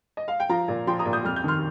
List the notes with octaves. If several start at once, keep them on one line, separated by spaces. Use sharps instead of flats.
D#5
F5
G5
F3 F5 A#5
A#2
F3 G5 C6
A#5 D#6
A#2
D#6 G6
F2 F6
G6
D#3 C6 F6